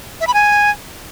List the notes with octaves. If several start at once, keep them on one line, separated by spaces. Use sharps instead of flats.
E5
B5
G#5